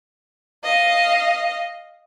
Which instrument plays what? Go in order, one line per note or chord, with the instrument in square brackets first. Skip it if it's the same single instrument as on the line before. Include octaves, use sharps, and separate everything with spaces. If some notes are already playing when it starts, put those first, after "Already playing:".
[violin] D#5 F5